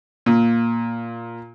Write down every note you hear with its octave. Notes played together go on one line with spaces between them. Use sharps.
A#2